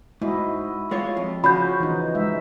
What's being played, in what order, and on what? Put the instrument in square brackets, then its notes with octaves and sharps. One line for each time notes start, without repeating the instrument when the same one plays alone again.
[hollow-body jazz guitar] G#2 [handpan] E4 F#4 D#5
[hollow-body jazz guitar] G#3 F4 C#5
F2
[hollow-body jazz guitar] C#3 F3 C#4 [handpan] F#4 [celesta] B5 G6
[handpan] E3 D#4
G#3 E5